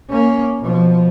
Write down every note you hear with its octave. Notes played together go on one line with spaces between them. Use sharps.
A#3 C#4
B2 F3